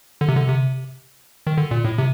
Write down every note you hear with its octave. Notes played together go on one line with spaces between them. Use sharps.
D3
C3
D3
C3
D#3
D3
A#2
A2
C3